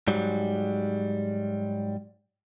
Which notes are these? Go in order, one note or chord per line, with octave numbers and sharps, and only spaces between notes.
G#2 F#3 G3